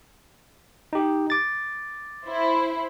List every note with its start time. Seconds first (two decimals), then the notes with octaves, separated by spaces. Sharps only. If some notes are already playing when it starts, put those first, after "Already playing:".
0.93 D#4 G4
1.30 D6 A6
2.26 E4 C5